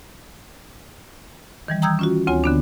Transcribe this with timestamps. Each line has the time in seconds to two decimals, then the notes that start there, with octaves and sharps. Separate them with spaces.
1.68 D#3 E3 G3
1.82 G5 A#5 D#6 E6 G6 G#6
1.99 C#4 F4 F#4
2.27 D2 C4 F4 C#5 G#5
2.44 D3 B3 D4